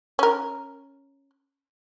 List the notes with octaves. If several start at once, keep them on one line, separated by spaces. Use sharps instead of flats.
C#4 A#4